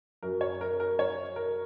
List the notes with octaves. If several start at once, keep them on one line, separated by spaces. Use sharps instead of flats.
F#2 F#3 A#4
C#5
A#4
A#4
C#5
A#4